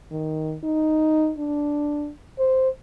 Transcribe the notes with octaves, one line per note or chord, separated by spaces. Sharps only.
D#3
D#4
D4
C5